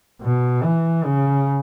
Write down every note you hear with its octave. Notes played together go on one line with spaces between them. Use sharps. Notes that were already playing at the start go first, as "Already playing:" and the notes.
B2
E3
C#3